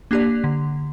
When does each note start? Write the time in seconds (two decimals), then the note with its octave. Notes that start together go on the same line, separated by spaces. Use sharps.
0.11 A#3 D4 G4 D5
0.44 D3